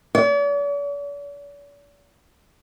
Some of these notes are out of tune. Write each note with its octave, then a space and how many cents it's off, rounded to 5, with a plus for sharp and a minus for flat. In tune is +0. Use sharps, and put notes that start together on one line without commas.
D5 -45